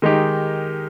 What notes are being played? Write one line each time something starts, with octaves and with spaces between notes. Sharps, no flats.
D#3 G#3 D#4 G4